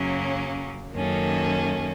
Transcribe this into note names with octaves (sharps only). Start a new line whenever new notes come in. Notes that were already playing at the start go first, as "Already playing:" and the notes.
Already playing: F#2 C#3 F#3 A#3 C#4
F#2 D#3 A#3 C#4 A4